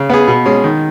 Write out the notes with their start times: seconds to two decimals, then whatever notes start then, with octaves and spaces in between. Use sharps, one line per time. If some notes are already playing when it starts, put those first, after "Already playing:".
Already playing: C#3
0.10 B3 G#4
0.28 B2
0.46 G#3 C#4
0.64 D#3